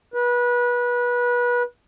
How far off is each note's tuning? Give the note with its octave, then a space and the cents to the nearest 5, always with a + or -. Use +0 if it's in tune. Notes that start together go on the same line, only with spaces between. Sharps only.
B4 -25